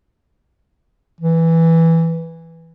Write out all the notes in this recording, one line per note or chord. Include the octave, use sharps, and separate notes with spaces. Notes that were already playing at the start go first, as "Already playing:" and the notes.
E3